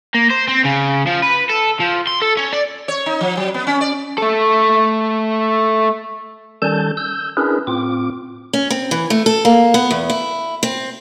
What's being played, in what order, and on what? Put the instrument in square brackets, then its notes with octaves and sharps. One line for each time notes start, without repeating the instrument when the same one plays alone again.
[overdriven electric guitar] A#3
C5
C4
C#3
F3
B4
A4
F3
C6
A4
C#4
D5
[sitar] C#5
D#4
F3
F#3
B3
C#4
D5
[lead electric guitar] A3 A4
[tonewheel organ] D#3 G3 C#4 A4 A5 G6
E6 G6
C#4 D4 E4 G#4 A#4 B4
A2 C4 F4 D6
[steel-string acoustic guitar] C#4
C4
E3
A3
A4
A#3
B3
E2
E4
C4